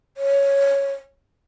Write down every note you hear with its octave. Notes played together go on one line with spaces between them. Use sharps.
C#5